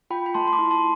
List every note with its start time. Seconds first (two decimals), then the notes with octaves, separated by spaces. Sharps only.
0.10 F4 G5 B5
0.26 B5
0.34 A3 A5 C6
0.47 C6
0.53 B5 D6
0.59 E4
0.71 A5 C6